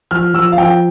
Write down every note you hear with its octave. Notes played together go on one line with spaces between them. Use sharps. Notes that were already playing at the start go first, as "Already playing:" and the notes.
F3 F6
F3 E6
F5
F3 G5